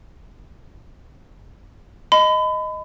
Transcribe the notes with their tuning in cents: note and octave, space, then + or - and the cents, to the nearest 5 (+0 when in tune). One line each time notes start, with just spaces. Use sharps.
D#5 +0 B5 +35